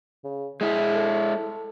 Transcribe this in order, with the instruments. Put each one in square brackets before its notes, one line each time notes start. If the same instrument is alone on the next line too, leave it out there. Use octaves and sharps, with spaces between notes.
[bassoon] C#3
[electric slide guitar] G#3 E4 [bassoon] G#4
[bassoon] A4